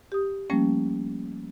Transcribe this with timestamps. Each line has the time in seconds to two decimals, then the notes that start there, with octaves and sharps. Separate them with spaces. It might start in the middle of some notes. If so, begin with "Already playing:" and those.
0.12 G4 D#6
0.50 F3 G3 A3 A#3 C#4